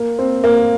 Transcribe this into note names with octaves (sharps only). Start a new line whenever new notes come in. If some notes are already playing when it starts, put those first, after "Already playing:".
Already playing: A#3
C4
A#3